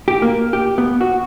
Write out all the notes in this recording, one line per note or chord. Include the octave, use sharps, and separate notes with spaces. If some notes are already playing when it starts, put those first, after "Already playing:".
G4
A#3
G4
B3
F#4